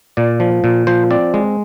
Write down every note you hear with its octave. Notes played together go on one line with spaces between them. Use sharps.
A#2 D5
F3
A#2
F3 C5
C4 D5
G#3